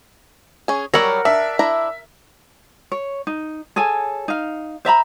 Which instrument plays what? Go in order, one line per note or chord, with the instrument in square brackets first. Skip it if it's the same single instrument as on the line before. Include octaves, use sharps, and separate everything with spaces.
[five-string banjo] C#4 G#4
[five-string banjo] F#3 G3 C#5 [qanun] A#4 F#5 [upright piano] E6
[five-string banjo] D4 [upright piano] E5
[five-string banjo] D4 E4 A#5
[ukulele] C#5
D#4
G#4 A4 C#5 G#5
D#4 F5
C5 E5 A#5 B5